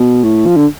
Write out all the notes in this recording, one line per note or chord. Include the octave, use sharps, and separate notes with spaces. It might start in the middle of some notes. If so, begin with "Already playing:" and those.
Already playing: B2
A2
F3
D3